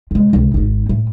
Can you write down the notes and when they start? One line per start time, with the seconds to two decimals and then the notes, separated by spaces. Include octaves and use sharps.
0.11 C3 G#3
0.33 C#2 C3
0.54 G#1 D#4
0.89 A2